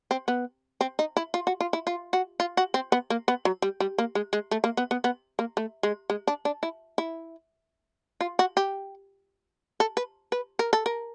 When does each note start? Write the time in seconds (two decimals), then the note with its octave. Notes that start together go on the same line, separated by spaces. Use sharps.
0.11 C4
0.28 B3
0.81 C4
0.99 D#4
1.17 E4
1.34 F4
1.47 F#4
1.61 F4
1.73 E4
1.87 F4
2.13 F#4
2.40 F4
2.57 F#4
2.74 C4
2.92 B3
3.10 A#3
3.28 B3
3.45 F#3
3.62 G3
3.80 G3
3.98 A#3
4.15 G#3
4.33 G#3
4.51 A3
4.64 A#3
4.77 B3
4.91 B3
5.04 B3
5.39 A#3
5.57 A3
5.83 G#3
6.10 G#3
6.27 D4
6.45 D4
6.63 E4
6.98 E4
8.21 F4
8.39 F#4
8.57 G4
9.80 A4
9.97 B4
10.32 B4
10.59 A#4
10.73 A4
10.86 A#4